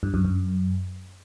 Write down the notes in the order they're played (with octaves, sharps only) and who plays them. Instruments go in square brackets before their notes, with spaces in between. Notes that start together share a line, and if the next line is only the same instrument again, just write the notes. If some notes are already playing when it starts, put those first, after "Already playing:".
[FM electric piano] G2
F#2
F#2